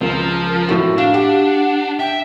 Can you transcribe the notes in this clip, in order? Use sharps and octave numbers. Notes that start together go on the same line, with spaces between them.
C#2 F3 A#4
A2 F#4
D4 F5
G4 F#5
E5 G5